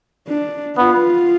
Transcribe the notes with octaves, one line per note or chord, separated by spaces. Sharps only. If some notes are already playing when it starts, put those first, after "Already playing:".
D4
B3 F4